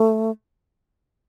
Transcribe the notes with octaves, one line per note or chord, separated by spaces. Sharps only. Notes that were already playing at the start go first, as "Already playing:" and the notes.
Already playing: A3